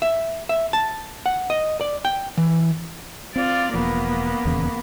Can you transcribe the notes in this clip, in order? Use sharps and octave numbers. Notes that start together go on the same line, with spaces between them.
E5
E5
A5
F#5
D#5
D5
G5
E3
C4 F4 D5
E1 F3 A#3 B3
D#1 E2 C#3